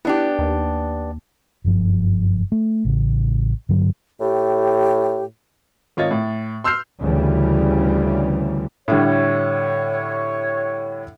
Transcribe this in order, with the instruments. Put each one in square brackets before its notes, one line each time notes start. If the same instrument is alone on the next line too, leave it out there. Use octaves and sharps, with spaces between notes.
[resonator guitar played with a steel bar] B3 D4 G4 [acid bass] E4
[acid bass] D#2
[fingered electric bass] F#1 G2 F3
A3
A1 C#3
G2 D3 F#3
[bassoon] A2 [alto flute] G4
[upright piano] G#1 F4 C#5 D#5 A6
A2
C6 E6 F6 G6 C7
[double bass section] D2 C#3 E3 G3
[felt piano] A2 D3 G3 [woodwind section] C#5